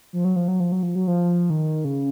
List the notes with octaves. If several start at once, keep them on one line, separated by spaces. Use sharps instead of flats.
F3
F#3
F3
F#3
F3
F#3
F3
F#3
F3
D#3
C#3